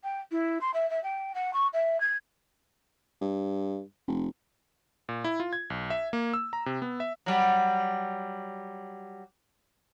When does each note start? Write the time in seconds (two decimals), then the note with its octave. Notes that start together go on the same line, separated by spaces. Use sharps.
0.03 G5
0.31 E4
0.61 C6
0.73 E5
0.90 E5
1.03 G5
1.34 F#5
1.53 C#6
1.73 E5
2.00 G#6
3.21 G2
4.08 F1
5.09 A#2
5.24 E4
5.40 F4
5.53 G#6
5.70 B1
5.90 E5
6.13 A#3
6.34 E6
6.53 A#5
6.66 C3
6.82 B3
7.00 E5
7.26 F#3 G3